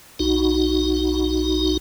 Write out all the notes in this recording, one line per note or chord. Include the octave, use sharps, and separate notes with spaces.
B1 D#4 F#4